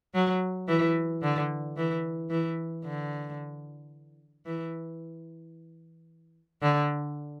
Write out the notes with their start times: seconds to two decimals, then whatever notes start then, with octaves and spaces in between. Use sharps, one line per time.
0.15 F#3
0.68 E3
1.22 D3
1.77 E3
2.30 E3
2.85 D3
4.46 E3
6.62 D3